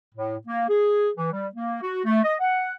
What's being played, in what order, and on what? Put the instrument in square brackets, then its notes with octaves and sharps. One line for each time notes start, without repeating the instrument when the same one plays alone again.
[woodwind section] A2
A#3
G#4
E3
G3
A#3
F#4
A3
D#5
F#5